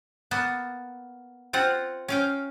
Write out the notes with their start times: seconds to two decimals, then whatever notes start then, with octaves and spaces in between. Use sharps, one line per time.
0.31 A#3 B3 A5
1.53 C4 F4 F#5
2.08 C#4 F5 G5